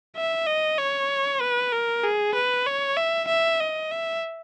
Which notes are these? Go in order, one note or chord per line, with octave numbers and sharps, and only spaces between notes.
E5
D#5
C#5
B4
A#4
G#4
B4
C#5
E5
E5
D#5
E5